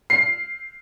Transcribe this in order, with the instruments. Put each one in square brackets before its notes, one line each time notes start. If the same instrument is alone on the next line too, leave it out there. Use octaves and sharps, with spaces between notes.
[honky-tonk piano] C7